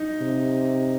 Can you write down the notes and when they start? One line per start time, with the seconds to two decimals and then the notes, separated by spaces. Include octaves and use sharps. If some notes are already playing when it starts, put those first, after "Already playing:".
Already playing: D#4
0.21 C3